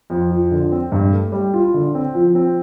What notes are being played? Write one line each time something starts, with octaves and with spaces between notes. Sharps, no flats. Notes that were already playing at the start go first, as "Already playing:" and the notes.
F2
F3
D3
C4
G2
A3
G3
F4
D3
C4
F3
C4